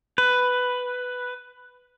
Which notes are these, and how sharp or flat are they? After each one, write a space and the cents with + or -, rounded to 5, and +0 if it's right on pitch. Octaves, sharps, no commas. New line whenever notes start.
B4 +5